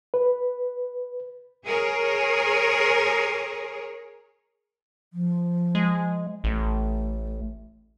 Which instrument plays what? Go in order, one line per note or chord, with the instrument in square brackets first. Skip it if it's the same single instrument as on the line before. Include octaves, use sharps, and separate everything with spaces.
[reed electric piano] B4
[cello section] G#4 A#4 C#5
[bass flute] F3
[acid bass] G#3
[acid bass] A1 [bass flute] A3